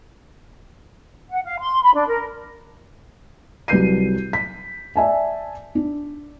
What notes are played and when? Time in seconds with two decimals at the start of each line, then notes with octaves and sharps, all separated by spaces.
1.30 F#5
1.44 F5
1.60 C6
1.82 B5
1.94 D4
2.08 A#4
3.68 C2 F#3 B4 G6 C7 D#7
4.33 B6
4.96 D5 E5 G#5 A5
5.75 D4